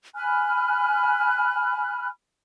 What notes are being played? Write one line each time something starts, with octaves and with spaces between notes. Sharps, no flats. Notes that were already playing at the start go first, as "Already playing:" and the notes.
G#5 B5 F6 F#6